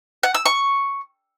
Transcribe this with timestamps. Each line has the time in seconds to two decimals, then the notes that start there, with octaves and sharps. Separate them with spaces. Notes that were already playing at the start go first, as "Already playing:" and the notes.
0.23 F#5
0.34 E6
0.46 C#6